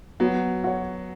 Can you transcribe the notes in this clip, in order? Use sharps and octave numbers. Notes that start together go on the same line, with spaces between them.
F#3 B3
F#4 C#5